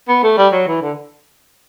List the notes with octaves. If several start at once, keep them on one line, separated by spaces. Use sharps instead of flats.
B3
A3
G3
F#3
E3
D3